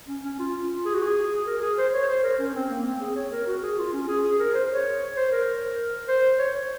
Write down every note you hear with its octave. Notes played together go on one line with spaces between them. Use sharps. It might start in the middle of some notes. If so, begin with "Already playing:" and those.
C#4
C#4
F4
G#4
F#4
G#4
A#4
G#4
C5
C#5
C5
A#4
C#4
C4
A#3
C4
G#4
C#5
A#4
F#4
G#4
F4
C#4
G#4
G#4
A#4
C5
C#5
C5
A#4
C5
C#5
C#5